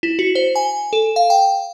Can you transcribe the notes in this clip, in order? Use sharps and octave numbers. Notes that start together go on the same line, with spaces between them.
E4
F#4
C5
G#5
A4
F5
G5